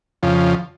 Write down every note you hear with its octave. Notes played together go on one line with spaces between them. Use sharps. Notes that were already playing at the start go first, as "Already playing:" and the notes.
F2 C#3 F3